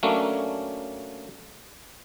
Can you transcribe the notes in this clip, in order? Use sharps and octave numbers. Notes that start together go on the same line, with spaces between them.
F#3 A3 A#3 C#4 D4